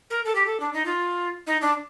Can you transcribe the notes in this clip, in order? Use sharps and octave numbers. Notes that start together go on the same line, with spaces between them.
A#4
A4
G4
A4
D4
D#4
F4
D#4
D4